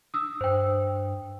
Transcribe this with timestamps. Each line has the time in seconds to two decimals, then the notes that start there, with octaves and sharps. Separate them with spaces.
0.14 D#6 E6
0.41 G2 C5 G5